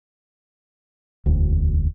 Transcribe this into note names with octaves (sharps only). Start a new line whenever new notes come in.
E1 D2